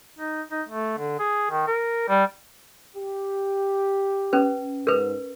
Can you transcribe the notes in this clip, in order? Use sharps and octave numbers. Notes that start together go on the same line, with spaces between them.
D#4
D#4
A3
D3
G#4
D#3
A#4
G3
G4
C#4 B4
G#2 A#4 B4